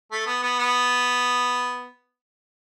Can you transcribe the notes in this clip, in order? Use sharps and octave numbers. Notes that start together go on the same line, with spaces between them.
A3
B3
B3
B3